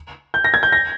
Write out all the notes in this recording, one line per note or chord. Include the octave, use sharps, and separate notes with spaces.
G6
A#6
G#6
G6
A#6